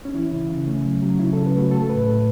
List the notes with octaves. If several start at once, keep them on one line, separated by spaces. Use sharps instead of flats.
C#4
E3 E4
C#3
C#3
A3 C#4
F#3
F#3
C#3 E4
A4
C#3
B4
A3 F#4
A3 A4
A2 B4
A2 A4